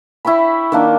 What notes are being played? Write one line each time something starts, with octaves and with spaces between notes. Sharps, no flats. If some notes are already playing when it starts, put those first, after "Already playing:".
E4 C#5 G5 B5
D#3 A#3 D4